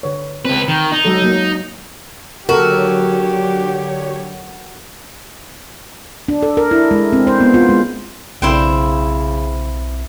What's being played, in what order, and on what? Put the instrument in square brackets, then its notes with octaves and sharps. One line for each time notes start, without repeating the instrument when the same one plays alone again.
[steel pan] D3 B4 C#5
[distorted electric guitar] C#2 B4 [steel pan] C4
[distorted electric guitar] D#3
D#4
[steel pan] F#3 G#3 A4
F#3 A#3
[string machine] D3 F#3 C#5 [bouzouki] F#4 [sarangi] G4 [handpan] A4 A#4
[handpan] D4
A4
A#4
E4
G#3
C4
C5
B3
F4
G#3
[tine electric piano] B1 C4 [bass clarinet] C#3 [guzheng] E4 C5 G5